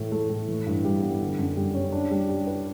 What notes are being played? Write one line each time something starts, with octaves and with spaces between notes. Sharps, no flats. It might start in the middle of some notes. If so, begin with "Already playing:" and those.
Already playing: A2 E3
A3
A2
E3
G2
G3
B3
D3
F#2
G3
C#4
D4
G3
G4
B4